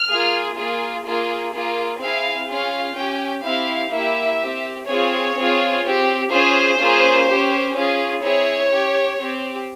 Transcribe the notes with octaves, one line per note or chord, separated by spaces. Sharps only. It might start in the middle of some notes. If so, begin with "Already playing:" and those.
Already playing: F6
A#3 F4 G#4
A#3 F4 G#4
A#3 F4 G#4
A#3 F4 G#4
C4 E4 G#4 F5
C#4 F4 G#4 F5
C#4 G4 G5
C4 E4 G4 F5
A#3 E4 G4 E5
C4 G4
C4 F4 G#4 C#5
C4 F4 G#4
C4 G4
C#4 F4 G#4 C5
A#3 C#4 F4 G#4
C#4 G4
C#4 F4 G#4
C4 E4 G#4 C#5
C#4 G4
C4 G4